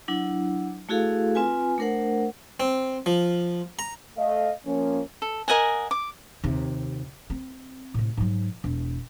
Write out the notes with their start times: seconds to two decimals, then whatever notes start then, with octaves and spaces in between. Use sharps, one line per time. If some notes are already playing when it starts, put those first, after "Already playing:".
0.08 F#3 D4 E4
0.89 A3 E4 F#4 G#4 A4 F5
1.35 C4 F4 B4 G#5
1.78 A3 D4 A#4 C5 F#5
2.60 C4
3.06 F3
3.79 A#5
4.17 A3 D#5 F5
4.66 F3 A#3 C#4
5.22 A4
5.48 A#4 D#5 F#5 G#5
5.91 D6
6.44 D#2 C3
7.30 C4
7.94 A2 C3
8.17 G#2 F#3
8.64 E1